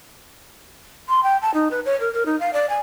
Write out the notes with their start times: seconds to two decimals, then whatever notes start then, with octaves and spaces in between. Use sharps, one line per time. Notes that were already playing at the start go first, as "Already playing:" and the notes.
1.09 C6
1.23 G5
1.42 A5
1.54 D#4
1.71 B4
1.86 C#5
2.00 A#4
2.14 A#4
2.26 D#4
2.40 F5
2.53 D5
2.70 G#5